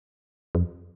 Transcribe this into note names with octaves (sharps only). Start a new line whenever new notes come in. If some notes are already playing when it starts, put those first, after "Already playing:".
F2